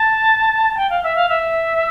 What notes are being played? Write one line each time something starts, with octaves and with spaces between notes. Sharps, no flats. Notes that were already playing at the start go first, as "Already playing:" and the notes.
Already playing: A5
A5
G5
F5
E5
F5
E5